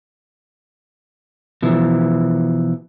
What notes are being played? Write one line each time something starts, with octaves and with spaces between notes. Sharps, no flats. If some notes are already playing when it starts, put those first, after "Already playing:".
B2 E3 F3